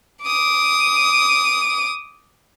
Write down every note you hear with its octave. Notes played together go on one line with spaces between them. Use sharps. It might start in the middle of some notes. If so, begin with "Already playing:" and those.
D6 D#6